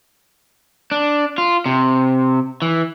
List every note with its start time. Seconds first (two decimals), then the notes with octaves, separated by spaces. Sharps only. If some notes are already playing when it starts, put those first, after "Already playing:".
0.91 D4
1.38 F4
1.66 C3
2.62 E3